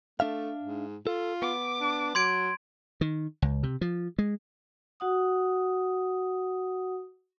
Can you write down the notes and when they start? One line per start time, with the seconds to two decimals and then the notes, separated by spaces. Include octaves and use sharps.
0.20 A3 D4 E5 F5
0.62 G#2
1.07 F4 A4
1.42 B3 D6
1.80 D4
2.15 F#3 C6 G#6 D7
3.01 D#3
3.42 C#2
3.63 C3
3.81 F3
4.19 G#3
5.00 F#4 F#5 D#6